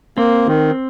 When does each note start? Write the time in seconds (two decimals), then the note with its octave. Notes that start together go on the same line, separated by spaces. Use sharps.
0.17 A#3 C4
0.47 D#3